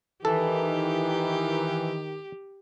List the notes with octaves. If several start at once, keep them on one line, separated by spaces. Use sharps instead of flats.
D#3 E3 G4 A4